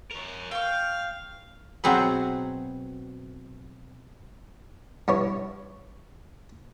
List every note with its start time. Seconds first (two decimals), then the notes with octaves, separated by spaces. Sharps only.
0.11 A#4 C#5
0.51 F5 G5 C#6 F6
1.84 B2 F#3 C4 G#4 B4
5.08 G2 E4 C#5